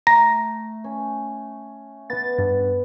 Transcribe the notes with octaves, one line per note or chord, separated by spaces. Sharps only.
A3 A#5
C#4
B3 A6
G2